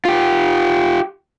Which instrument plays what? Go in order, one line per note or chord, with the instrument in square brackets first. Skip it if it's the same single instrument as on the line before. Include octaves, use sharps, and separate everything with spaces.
[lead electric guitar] F4 G4